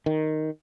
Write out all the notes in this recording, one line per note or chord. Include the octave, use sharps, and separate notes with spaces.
D#3